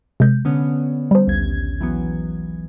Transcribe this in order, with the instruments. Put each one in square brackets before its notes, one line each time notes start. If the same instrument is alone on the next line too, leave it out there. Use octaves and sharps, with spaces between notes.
[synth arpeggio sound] C3 G#3 G6
[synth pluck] D3 B3 C#4
[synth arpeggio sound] G3 C5
[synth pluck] A#1 D#2 G#6
E3 F#3 B3